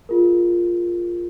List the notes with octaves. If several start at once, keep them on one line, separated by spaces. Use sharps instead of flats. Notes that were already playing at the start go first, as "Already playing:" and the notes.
F4 G#4 A#4